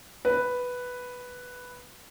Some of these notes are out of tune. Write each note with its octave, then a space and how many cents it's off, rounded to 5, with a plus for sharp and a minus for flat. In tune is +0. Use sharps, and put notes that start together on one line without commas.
B4 +0